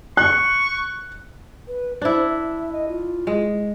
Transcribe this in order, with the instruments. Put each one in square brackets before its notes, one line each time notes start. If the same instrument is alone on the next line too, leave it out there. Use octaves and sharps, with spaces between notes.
[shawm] C#6 [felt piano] F#6
[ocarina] B4
[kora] D4 E4 [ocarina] C5
[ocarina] E5
D#5
F4
[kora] G#3